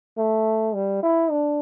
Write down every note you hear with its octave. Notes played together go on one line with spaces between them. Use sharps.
A3
G3
E4
D4